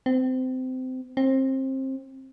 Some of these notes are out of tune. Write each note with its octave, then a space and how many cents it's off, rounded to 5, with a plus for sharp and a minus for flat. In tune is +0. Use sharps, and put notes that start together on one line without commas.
C4 -25
C4 +25